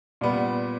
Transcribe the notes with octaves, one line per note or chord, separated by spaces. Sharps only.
A#2 G3 B3